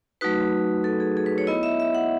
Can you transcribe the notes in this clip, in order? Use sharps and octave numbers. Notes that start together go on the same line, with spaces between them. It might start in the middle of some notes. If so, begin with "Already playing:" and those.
F#3 A3 D#4 F#4 B4
A4
G#4
G#4
B4
C#5
B3 E4 D#5
E5
E5
F#5